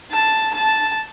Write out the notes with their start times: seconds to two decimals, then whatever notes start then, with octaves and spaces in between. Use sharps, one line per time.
0.11 A5
0.54 A5